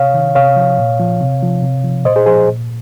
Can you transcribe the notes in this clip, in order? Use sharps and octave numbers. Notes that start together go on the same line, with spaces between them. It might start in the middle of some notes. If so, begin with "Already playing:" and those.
Already playing: C3 C#5 F5
D#3
C3 C#5 F5
F3
A#2
F3
C3
F3
C3
F3
A#2 C5 D#5
G#4 C5
F3 G#4 C5
A#2